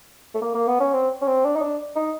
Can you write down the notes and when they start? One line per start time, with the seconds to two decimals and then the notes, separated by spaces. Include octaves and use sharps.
0.34 A3
0.42 A#3
0.54 A#3
0.67 B3
0.80 C#4
0.93 C4
1.21 C#4
1.27 C4
1.44 D4
1.56 D#4
1.62 D4
1.96 D#4